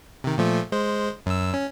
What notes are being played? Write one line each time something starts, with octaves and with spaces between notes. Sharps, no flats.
C3 D#3
A#2 F3 A3
G#3 C5
F#2 E6
C#4